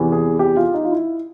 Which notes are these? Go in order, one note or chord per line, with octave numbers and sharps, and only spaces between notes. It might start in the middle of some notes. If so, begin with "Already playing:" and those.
Already playing: E2 C3 E3
G#4
G4
F4
D#4
F4
E4